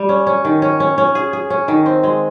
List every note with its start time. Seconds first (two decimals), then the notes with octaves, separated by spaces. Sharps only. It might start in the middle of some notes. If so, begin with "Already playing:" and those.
Already playing: G3
0.09 C#4
0.27 C#4
0.45 D#3
0.62 C#4
0.80 C#4
0.98 C#4
1.15 G#4
1.33 G#4
1.50 C#4
1.68 D#3
1.86 C4
2.03 G#3